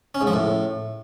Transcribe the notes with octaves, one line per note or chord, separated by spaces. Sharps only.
C#4
G#2
F3
A2